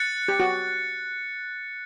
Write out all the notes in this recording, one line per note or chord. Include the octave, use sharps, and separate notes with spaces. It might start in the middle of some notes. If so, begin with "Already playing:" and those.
Already playing: F#6 A6 C#7
G4
F#4